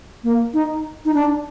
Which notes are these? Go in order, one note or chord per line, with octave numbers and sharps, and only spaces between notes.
A#3
D#4
D#4
D4